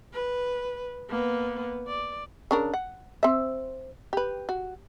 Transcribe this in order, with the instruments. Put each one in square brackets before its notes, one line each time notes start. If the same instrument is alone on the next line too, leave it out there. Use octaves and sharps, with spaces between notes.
[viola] B4
A#3 B3
D5
[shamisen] C#3 D4 A#4
F#5
C4 E5
G4 B4
F#4